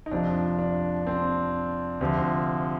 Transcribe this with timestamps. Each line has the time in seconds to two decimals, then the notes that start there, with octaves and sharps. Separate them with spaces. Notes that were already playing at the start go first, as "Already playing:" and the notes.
0.06 D#4
0.11 F2 C3 F3 D4
0.59 D4
1.07 C4
2.01 D2 C3 F3